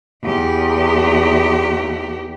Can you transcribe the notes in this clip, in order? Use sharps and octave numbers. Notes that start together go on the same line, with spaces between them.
E2 G4